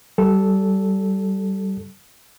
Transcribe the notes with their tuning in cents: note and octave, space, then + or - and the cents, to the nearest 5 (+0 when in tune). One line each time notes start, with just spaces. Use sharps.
G3 -25 A4 -5